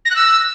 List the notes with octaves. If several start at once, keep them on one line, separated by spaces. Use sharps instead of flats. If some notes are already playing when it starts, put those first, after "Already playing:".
A#6
F#6
E6